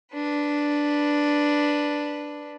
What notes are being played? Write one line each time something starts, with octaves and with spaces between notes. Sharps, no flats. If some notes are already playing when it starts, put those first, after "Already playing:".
D4 B4